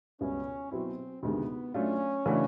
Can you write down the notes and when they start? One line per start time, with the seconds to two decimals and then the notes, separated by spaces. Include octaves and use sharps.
0.21 C#2 B2 G3 B3 C#4
0.71 B2 F#3 B3 C4 E4
1.23 D2 C3 D#3 G#3 B3
1.74 F#3 A3 C#4 D4 F4
2.26 C#3 E3 A3 D4 F#4